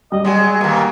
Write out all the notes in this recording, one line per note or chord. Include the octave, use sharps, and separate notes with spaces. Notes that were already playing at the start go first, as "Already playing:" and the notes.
G3 D#5
F#3 G#3 G4 D5 G#5
B2 D#3 A#3 G#5